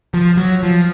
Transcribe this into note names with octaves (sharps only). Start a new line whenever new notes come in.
F3
F#3
F3